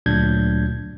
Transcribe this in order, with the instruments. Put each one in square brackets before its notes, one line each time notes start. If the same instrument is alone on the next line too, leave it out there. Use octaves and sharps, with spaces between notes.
[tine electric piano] D2 A#2 F#3 D4 G6 G#6